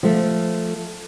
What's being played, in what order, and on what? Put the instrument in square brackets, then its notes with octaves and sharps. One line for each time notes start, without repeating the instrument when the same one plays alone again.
[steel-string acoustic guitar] F3 A3